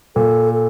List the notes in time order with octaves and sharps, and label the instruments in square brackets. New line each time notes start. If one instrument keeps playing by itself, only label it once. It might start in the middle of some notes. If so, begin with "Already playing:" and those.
[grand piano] A#2 [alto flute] A4
[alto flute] A4